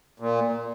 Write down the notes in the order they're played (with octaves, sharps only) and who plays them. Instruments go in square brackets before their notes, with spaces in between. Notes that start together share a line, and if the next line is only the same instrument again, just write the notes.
[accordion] A#2